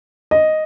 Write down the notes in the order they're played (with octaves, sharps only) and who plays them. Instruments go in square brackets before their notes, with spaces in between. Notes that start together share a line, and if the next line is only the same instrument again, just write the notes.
[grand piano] D#5